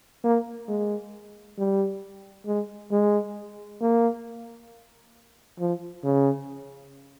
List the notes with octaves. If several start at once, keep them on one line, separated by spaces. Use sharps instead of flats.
A#3
G#3
G3
G#3
G#3
A#3
F3
C#3